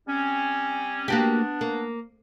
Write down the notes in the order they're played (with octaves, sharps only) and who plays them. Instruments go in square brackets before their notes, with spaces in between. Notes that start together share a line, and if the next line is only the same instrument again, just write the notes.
[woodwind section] G3 C4 C#4
[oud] A#3 F#4 G4 [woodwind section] B3 D4
[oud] A#3